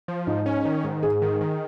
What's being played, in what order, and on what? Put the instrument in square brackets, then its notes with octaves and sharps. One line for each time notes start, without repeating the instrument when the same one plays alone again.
[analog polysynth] F3
[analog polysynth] G#2 [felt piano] D#4
[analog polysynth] C#4
D#3
G#2
[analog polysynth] G#2 [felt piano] G#4
[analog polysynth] D#3
D#3